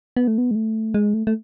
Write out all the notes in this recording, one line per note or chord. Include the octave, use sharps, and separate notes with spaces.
B3
A3
B3
G#3
A3
G#3
A3
A3